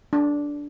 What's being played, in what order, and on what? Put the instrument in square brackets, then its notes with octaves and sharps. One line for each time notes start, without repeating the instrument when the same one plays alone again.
[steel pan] D4